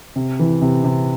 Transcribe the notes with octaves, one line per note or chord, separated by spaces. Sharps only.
C3
E3
C3
C3